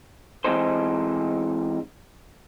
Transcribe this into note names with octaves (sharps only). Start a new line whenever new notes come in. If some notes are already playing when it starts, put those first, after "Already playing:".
E3 G#3 C4 D#4 A4 C5